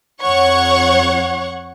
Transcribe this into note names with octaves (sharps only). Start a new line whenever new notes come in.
F2 C#5 F#5 C#6